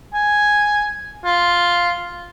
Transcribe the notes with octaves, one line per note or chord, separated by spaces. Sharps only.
G#5
F4